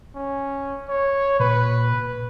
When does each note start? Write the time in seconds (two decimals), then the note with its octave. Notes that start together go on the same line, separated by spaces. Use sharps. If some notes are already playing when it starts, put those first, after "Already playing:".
0.16 C#4
0.89 C#5
1.40 A#2 B4